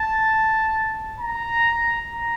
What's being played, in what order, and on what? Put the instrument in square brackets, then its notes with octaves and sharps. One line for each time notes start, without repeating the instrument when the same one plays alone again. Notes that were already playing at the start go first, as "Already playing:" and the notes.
Already playing: [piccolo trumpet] A5
A#5
A#5